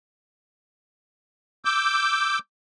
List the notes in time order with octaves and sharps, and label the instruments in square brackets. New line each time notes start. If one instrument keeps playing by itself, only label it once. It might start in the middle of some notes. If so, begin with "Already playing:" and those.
[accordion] D6 E6 G6